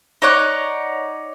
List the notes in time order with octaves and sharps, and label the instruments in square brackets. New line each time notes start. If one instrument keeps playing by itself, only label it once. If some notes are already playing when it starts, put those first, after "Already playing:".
[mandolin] D#4 C#5 D5 F#5